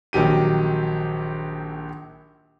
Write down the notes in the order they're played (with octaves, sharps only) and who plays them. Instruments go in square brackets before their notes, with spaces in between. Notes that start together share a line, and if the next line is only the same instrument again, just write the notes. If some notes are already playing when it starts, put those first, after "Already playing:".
[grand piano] A#1 D#3 F#3 G4 D#7